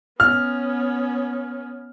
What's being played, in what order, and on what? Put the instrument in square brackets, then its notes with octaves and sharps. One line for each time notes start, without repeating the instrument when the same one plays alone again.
[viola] B3 C#4 [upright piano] F6